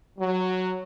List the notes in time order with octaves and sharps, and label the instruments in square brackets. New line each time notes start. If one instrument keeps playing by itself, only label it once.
[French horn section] F#3